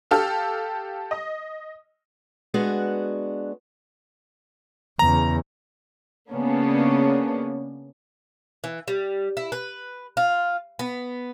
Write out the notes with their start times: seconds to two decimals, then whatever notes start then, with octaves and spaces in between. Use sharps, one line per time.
0.11 G4 A4 F5 E6 F6
1.11 D#5
2.54 G#3 B3 D4 F#4
4.99 E2 C#3 A#5
6.32 C#3 A#3 B3 C#4 D4
8.64 E3
8.88 G3
9.37 E4
9.52 B4
10.17 F4
10.79 B3